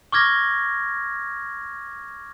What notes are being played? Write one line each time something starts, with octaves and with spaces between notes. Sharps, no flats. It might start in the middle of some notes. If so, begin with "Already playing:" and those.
C#6 D6 F6 G#6 A#6